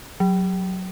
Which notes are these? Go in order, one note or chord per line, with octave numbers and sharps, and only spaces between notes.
F#3